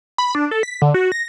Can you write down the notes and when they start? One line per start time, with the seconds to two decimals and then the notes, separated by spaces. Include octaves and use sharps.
0.18 B5
0.35 D4
0.51 A4
0.63 B6
0.82 D3
0.94 F#4
1.12 A#6